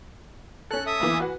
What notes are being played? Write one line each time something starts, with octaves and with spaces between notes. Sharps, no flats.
C#4 A4 F#6
E5 D#6
E3 A#3 B3
F#4 B4 F#5